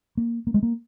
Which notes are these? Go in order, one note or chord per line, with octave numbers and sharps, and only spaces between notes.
A#3
A#3
G#3
A#3